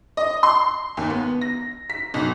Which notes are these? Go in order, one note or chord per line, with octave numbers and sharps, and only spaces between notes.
D#5
C6
D#2
B3
A#6
B6
B1